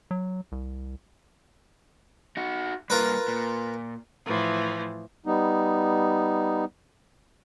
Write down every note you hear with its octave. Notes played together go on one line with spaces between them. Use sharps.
F#3
C2
D#4 F#4
G2 A#3 F4 A#4 B4
A#2
A2 E3 F3
G3 B3 D#4